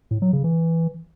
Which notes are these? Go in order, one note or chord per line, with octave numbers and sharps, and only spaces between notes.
A2
F#3
C#3
E3